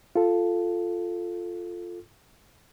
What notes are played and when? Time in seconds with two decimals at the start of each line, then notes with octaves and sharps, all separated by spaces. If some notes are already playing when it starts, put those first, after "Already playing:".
0.16 F4 A4